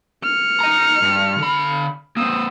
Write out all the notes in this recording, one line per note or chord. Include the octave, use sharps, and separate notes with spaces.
F6 C#7
D#5 A#5
G2
D3 B5
A#3 C4 D#6 E6